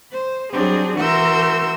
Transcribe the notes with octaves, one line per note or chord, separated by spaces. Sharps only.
C5
F#3 G3 C4 D4 G#4
E3 F#4 A#4 C6 E6 G6